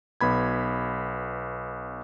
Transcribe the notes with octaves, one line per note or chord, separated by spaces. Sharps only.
B1 B3 B5 G#6